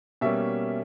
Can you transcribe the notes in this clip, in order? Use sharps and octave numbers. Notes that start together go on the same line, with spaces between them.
B2 G3 A#3 C#4 E5